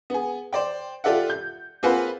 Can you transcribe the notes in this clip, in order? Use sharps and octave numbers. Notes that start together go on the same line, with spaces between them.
B3 G#4
C5 D5 G5
F4 G4 A4 D5 E5 F#5
G6
A#3 C4 F4 G#4 B4 F#5